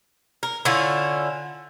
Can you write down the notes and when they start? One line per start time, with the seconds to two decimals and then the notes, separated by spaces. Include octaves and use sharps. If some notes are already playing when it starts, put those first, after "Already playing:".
0.43 A#4
0.65 D3 C#4 E4 F4